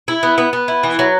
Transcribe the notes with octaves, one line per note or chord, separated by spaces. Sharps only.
E4
B3
B3
B3
E4
E3
F#3